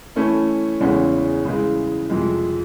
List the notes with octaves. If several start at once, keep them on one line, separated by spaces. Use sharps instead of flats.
E3 A3 C#4 E4
E2 C#3 E3 G#3 C#4
C#3 E3 G#3
F2 C3 F3 G#3